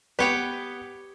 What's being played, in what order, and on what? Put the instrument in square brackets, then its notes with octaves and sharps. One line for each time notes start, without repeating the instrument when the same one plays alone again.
[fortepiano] B3 B4 [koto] G4 C#5 G5